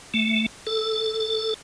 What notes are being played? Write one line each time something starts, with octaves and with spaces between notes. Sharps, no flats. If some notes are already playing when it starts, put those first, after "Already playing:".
A3
A4